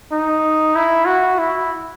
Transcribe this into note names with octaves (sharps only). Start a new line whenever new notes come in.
D#4
E4
F#4
E4